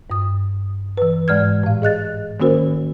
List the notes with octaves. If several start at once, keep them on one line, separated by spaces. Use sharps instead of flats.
G2 D#6
E3 B4
G#2 G#3 D5 F6 G#6
A2 F5
G#4 D#5 F#6 A6
D#3 A#3 C#4 F#4 A#4 C5